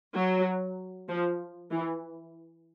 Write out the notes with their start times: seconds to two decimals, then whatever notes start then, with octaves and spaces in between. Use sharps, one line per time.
0.14 F#3
1.08 F3
1.71 E3